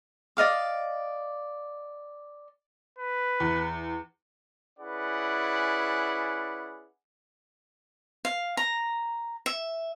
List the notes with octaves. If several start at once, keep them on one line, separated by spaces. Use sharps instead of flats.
D5 D#5 F5 D6
B4
E2
C#4 E4 G#4 B4 D5 F#5
F5
A#5
E5